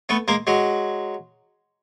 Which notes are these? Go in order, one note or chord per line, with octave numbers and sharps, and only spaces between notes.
A3 B3
G#3 A#3
F#3 G#3